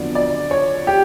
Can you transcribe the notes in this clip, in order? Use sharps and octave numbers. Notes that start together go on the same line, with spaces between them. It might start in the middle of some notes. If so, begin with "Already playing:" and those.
Already playing: F2 D3 F#3 B3 D5
D5
C#5
G4